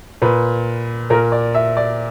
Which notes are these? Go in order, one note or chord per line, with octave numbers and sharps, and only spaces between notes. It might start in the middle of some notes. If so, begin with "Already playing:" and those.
A#2 B4
A#2 A#4
D5
E5
D5